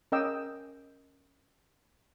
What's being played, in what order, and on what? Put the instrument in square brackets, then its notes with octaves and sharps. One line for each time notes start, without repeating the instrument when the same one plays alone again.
[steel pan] C#4 A#4 D#5 G5 D6 E6